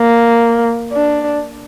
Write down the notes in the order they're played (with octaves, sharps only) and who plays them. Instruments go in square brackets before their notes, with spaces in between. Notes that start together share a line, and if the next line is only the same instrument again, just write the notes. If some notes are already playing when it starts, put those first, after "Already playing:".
Already playing: [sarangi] A#3
D4